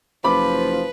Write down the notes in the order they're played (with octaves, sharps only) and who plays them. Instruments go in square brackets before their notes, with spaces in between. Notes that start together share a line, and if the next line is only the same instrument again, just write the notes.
[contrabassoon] F#1 [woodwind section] F3 [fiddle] B4 [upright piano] B5 D6